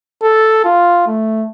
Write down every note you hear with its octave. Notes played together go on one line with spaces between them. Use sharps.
A4
F4
A3